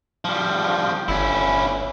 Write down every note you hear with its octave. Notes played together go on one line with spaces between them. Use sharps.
F3 G3
G1 C#4 E4